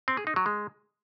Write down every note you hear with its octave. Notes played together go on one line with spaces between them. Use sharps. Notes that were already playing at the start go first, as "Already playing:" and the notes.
C4
G#4
D#4
F#3
G#3